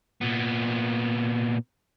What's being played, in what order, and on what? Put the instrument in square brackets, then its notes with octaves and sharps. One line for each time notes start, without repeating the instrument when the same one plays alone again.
[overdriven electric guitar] A#2 B3